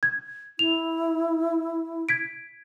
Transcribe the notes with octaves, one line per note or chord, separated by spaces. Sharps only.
G#6
E4 F7
G#6 B6 D7